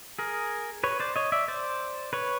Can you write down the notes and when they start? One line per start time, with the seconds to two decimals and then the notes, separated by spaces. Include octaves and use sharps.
0.19 G#4 A#4
0.84 B4 C#5
1.00 C5 D5
1.16 C#5 D#5
1.32 D5 E5
1.48 C5 D5
2.13 B4 C#5